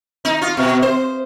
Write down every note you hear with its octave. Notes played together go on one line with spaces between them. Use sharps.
D#4
F4
B2
C5